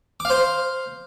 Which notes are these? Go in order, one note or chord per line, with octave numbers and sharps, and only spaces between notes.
C5 F5 D6